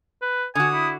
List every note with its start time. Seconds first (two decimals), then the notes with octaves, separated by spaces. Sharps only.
0.22 B4
0.55 D3 F#4 G#5 D#6
0.74 E4